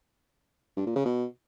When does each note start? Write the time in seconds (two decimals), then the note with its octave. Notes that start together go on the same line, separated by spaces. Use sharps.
0.77 G2
0.86 A#2
0.96 C#3
1.05 B2